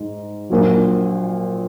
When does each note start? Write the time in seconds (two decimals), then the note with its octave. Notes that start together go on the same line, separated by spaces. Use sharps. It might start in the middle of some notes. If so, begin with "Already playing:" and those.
Already playing: G#2
0.50 A#1 A#2 F#3